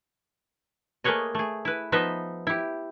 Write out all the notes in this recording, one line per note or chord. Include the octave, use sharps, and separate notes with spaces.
A3 A#3 G#4 B4 C#5 D#5
A3 G#4
E4 B4
F3 B3 D#4 B4 D#5 E5
E4 G4